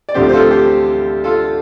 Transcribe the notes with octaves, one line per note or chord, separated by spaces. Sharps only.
D5
D2 D3 F3 C4 G4 C5
C5
F4 A4
G4 C5
F4 A4